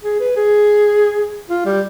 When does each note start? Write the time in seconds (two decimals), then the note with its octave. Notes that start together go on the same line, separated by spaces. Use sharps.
0.04 G#4
0.20 B4
0.36 G#4
1.49 F4
1.65 G3